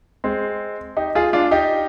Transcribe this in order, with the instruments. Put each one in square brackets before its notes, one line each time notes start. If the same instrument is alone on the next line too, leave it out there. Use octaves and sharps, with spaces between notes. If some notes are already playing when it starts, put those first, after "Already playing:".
[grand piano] G#3 C4
D#4 G4
F4 G#4
D4 F4
D#4 G4